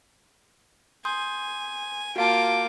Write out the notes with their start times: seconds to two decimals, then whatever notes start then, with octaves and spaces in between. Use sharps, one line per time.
1.05 G#5 C6 D#6 G6
2.16 A#3 F4 F#4 F5 G5 A5 D6